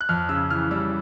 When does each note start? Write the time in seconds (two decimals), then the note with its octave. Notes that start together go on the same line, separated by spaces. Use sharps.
0.01 F#6
0.09 F2 F6
0.29 C#3 E6
0.50 E3 F6
0.71 G3 E6